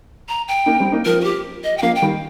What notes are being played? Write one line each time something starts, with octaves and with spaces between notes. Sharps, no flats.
A#5
G5
A#3 D#4
G3 C4
A#3 D#4
F3 A#4
F4
G4
D#5
G5
F3 A#3 F5
G5
D#3 G3